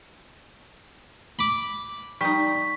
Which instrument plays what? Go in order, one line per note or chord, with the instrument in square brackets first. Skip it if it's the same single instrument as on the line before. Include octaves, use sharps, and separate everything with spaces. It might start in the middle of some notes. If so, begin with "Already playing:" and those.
[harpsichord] B5 D6
[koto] G3 D#4 [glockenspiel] C#6 B6